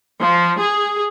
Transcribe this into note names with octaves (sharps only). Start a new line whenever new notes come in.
F3
G#4